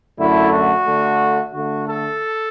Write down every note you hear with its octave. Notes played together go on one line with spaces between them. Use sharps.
F#2 D3 A3 E4
F#4
D3 A3
D3 A3 F#4
A4